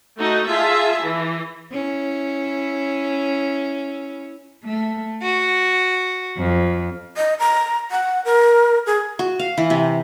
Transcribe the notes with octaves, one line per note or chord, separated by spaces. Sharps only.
A3 D#4 F#4
F4 G#4 E5 A5
E3
C#4 E4
A3
F#4
F2
D#5
A#5
F#5
A#4
G#4
F#4
F5
E3
C3